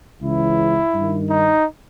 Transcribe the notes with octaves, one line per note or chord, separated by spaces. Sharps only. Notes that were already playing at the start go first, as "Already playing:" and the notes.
C#2 C#3 E3 E4
G2 D#3
D#4